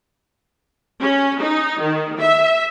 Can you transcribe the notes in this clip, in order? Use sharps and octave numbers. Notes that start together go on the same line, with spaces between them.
C#4
D#4
D#3
E5